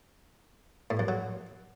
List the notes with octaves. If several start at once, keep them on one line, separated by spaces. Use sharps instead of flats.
A2
F#2
F#3